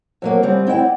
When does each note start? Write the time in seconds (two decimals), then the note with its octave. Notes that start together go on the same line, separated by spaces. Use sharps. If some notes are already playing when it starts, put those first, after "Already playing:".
0.22 F2 F#3 A#3
0.43 C#3 G3 C4
0.67 C4 E4 D#5 F#5 G5
0.79 D5